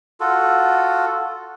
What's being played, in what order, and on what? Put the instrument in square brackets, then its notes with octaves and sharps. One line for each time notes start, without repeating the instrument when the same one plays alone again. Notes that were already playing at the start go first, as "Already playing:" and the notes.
[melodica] F4 F#4 A4